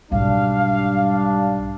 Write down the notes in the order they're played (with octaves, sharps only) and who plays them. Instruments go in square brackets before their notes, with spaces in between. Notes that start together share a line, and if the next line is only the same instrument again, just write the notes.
[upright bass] B1 G#2 [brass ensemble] G3 D4 [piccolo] F5